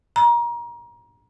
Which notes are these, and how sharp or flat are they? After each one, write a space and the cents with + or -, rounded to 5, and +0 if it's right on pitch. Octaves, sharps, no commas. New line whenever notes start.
A#5 +30